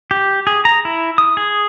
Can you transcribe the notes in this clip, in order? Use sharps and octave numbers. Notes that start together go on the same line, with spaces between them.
G4
G#4
A#5
E4
D#6
G#4